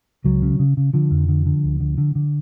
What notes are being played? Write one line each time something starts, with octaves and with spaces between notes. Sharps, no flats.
C#2 F#3
C#3
C#3
C#3
D3 F3
F2
D3
D3
D2
D3
D3
D3